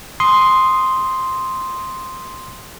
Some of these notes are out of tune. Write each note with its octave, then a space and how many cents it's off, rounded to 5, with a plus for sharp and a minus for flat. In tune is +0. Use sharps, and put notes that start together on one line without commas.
C6 +0 D#6 +0